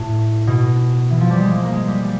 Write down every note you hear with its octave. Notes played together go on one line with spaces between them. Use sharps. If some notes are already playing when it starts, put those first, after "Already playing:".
Already playing: A2
B2
E3
F3
G3
G#3
A#3
A#3
G#3
G3
G3